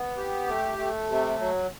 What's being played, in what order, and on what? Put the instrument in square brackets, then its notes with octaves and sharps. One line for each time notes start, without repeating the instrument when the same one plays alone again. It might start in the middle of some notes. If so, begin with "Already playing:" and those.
Already playing: [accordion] B3
G4
A3
A3
C3
F#3